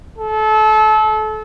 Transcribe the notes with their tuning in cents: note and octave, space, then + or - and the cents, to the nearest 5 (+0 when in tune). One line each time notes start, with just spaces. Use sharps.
A4 -30